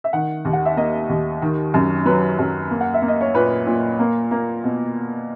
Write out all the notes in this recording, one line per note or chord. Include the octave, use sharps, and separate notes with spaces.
E5
D#3 F#5
D#2
F#5
E5
A#3 D#5
D#2
D#3
F#2
F#3 B4
F#2
A#3
F#5
E5
A#3
D#5
C#5
A#2 B4
A#2
A#3
A#3
B2